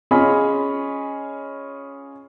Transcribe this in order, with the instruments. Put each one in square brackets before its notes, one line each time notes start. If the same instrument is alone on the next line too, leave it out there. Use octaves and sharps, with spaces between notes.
[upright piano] C#4 F4 G#4 C#5 D#5 B5